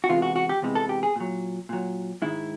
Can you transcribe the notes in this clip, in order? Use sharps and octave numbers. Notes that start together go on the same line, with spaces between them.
F#4
E2 C3 E3 G#3 F4
F#4
F#4
G4
E2 C3 E3 G#3
A4
G4
G#4
A#2 F#3
A#2 F#3
G#2 D#3 G#3 E4